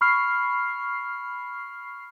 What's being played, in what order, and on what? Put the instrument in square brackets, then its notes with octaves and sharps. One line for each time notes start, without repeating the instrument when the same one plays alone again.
[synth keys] B5 C#6 F6 C7